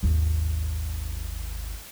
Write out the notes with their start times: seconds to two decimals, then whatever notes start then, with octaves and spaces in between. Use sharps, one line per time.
0.03 G#1 D#2